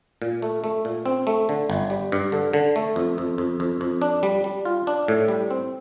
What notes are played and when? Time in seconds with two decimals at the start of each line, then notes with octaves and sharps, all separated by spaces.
0.22 A#2
0.42 A3
0.64 A3
0.85 A#2
1.06 C4
1.27 A3
1.49 D3
1.70 G1
1.90 G3
2.12 G2
2.32 D3
2.53 D3
2.76 A3
2.96 F2
3.18 F2
3.38 F2
3.60 F2
3.81 F2
4.02 D4
4.23 G3
4.44 G3
4.65 F4
4.87 D4
5.08 A2
5.28 G3
5.51 C4